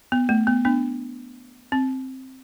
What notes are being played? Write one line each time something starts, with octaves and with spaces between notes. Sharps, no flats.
B3
A3
B3
B3 D4
C4